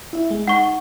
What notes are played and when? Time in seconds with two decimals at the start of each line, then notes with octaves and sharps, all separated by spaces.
0.13 E4 E5
0.29 G1 G#3
0.48 D#4 F#5 C#6